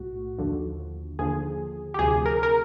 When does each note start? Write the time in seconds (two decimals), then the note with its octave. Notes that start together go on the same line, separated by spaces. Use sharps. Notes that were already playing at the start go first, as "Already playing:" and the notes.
Already playing: B1 A2 F#4
0.38 D#2 D3 F3
1.19 D#2 D3 F3 G#4
1.94 G4
1.99 D2 C3 F3 G#4
2.26 A#4
2.43 A#4